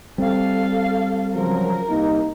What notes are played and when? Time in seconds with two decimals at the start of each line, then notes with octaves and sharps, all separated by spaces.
0.18 G3 C4 A4 F5
1.34 C#3 F3 F#3 A#4
1.89 C2 A#3 D#4